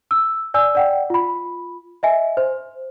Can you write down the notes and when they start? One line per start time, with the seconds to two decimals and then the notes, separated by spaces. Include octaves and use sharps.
0.11 E6
0.54 D5 G#5 E6
0.75 D5 F#5 G5
1.10 F4 B5
2.03 D#5 E5 G#5
2.37 C5